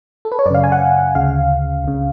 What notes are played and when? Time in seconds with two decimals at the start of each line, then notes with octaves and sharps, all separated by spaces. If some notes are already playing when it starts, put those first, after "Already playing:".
0.25 A4
0.32 B4
0.39 C#5
0.46 F#2 D5
0.50 C#3 F5
0.64 G#5
0.72 F#5
1.15 D2 C#3 F5
1.84 C#2 C#3